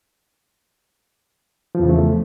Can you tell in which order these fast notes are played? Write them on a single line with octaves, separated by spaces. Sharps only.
F3 E2 C#3 A3